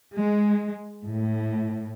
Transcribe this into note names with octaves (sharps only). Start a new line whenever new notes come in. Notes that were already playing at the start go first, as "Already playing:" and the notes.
G#3
A2